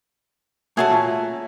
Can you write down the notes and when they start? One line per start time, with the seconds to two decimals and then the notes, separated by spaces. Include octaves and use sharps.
0.77 A3 C#4 F#4 G#4 A4 A5
0.90 A#2